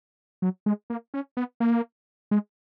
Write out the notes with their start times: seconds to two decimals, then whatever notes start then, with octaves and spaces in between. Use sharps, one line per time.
0.42 F#3
0.66 G#3
0.90 A#3
1.14 C#4
1.37 B3
1.60 A#3
2.31 G#3